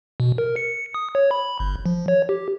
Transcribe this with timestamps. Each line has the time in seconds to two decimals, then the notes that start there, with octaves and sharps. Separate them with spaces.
0.20 B2
0.38 A#4
0.56 C#7
0.94 D#6
1.15 C#5
1.31 B5
1.60 G1
1.86 F3
2.08 C#5
2.29 G4